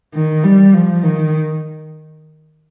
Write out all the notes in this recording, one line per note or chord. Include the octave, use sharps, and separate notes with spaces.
D#3
G3
F3
D#3